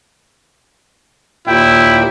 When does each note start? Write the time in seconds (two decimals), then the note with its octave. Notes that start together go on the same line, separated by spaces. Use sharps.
1.47 D#2 A#2 E4 G5